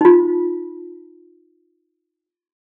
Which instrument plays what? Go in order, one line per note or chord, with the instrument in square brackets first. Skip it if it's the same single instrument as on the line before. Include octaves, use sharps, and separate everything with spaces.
[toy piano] D#4 F4